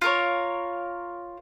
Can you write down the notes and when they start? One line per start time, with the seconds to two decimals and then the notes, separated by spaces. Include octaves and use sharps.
0.01 F4 A#4 C#5